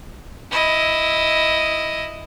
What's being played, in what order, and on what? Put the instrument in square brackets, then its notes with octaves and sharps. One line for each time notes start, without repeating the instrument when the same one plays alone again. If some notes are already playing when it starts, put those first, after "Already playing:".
[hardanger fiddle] E4 D#5